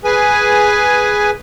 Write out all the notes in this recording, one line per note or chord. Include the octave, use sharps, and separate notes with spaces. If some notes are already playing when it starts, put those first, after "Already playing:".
G#4 B4 G#5